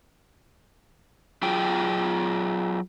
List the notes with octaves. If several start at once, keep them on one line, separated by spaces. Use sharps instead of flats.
F#3 F4 G#4 G5